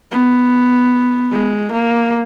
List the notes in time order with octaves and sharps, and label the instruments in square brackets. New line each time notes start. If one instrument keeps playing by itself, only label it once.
[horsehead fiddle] B3
G#3
A#3